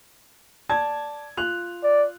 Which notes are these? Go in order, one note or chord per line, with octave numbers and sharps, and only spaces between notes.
D5 A5 G#6
F4 F#6 F7
D5